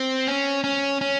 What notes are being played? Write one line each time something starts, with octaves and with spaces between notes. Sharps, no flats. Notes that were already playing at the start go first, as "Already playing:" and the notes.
Already playing: C4
C#4
C#4
C#4